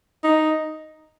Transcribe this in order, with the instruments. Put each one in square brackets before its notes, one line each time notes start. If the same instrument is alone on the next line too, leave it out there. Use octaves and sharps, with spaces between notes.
[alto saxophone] D#4